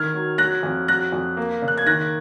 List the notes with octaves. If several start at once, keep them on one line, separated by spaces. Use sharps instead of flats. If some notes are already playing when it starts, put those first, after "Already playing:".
Already playing: D#3 F6 G#6
F#3
F#3 F#6 A#6
F2
F#3 F#6 A#6
F2
A#3
C#3
F#6
G#6
D#3 F#6 A#6